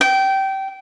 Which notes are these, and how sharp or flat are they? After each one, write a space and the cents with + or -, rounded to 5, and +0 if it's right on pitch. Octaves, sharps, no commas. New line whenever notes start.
G5 -20